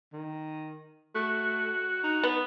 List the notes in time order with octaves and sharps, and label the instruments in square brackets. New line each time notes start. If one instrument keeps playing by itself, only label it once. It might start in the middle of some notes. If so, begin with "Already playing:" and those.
[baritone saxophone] D#3
[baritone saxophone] A3 [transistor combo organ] F#4
[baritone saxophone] D#4
[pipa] B3